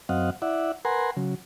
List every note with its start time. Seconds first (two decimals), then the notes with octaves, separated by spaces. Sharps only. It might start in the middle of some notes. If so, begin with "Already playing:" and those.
0.09 F#2 C4 D#5 F5 F#5
0.42 E4 D5 E5 F#5
0.85 A#4 B4 F#5 G#5 A#5 C6
1.17 C#3 F#3